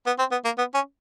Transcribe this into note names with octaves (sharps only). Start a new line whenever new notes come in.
B3
C4
B3
A#3
B3
C#4